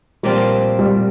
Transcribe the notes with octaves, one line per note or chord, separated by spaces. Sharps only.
A#2 F3 G3 C4 F4
G3